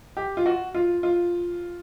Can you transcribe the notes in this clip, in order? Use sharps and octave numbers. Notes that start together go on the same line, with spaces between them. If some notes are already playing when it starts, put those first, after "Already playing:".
G4
F4
F#4
F4
F4